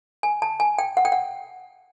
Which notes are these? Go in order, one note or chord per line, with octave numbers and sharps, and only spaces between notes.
G#5
A5
G#5
G5
F#5
G5
F#5